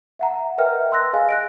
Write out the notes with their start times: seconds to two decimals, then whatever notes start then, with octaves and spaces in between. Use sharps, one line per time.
0.19 E5 F#5 A#5
0.58 A#4 B4 D#5 E5 G5 F6
0.91 G5 C6 E6 F#6 A#6
1.13 G#4 D#5 F5 G#5
1.29 F#6 A#6 D7